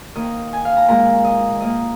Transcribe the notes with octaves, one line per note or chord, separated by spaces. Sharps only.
D#3 A#3 D#5
G#5
F5
A#5
A#2 G#3 A#5
D#5
D#3 A#3 D#5